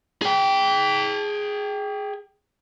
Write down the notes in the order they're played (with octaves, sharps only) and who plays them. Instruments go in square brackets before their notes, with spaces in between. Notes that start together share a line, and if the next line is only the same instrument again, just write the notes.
[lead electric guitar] G#4 G5